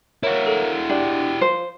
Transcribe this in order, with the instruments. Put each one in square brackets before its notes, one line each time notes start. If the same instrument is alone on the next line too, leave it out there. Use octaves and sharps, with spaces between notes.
[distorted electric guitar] E4 F#4 [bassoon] A#4 [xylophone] C#5
[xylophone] A4
[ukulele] D4 [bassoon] G4
[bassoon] F3 [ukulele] C5